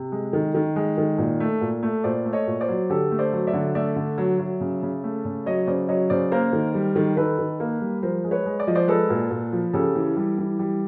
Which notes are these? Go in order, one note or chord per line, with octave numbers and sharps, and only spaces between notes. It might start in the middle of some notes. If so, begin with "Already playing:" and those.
Already playing: C3
G#3
D#3
D#3
G#3
D#3
A#2
A3
A#2
A3
A#2 C5 D5
A3
C#5 D#5
A#2
C5 D5
F#3
D3 G4 A4
A3
C5 D5
F#3
D5 E5
D3
A3 D5 E5
D3
F#3
F#3
C#3
C#3
A3
C#3
F#3 C#5 D#5
C#3 C5 D5
F#3 C#5 D#5
C#3 C5 D5
A#3 A#4 C5
D#3
G3
D#3
D#3 A4 B4
D#3
A#3
G3
F3 A#4 C5
G#3
B4 C#5
G#3
D5
F3 D#5
C5 D5
G#3 A4 B4
A#2
A#2
F3
C#3 G4 A4
E3
G3
E3
G3